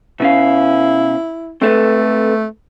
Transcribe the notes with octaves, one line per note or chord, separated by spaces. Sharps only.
B2 C#4 E4 F5
A3 C4 A4 B4